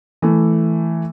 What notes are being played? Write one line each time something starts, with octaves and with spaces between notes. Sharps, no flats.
E3 A3